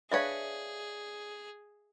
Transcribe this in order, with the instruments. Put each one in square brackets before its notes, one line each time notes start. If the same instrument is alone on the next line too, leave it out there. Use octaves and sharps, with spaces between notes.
[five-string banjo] D4 B4 C#5 [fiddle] G#4 [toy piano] E5 F5